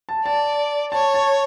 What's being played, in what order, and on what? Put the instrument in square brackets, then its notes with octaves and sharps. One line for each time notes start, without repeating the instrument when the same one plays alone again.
[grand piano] A5
[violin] D5 [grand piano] A5
[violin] C#5 [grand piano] A5
[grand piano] A5